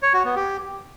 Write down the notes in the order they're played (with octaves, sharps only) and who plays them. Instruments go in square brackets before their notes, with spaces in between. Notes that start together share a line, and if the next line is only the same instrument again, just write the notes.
[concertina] C#5
F#4
B3
G4